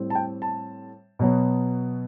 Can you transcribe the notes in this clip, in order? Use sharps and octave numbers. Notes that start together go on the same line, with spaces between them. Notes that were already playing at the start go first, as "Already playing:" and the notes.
Already playing: A2 G3 C4
A5
G5
A5
B2 F#3 B3